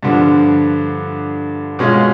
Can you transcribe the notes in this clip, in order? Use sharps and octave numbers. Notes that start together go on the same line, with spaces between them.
G2 D3 F3
B2 G#3 C#4 F4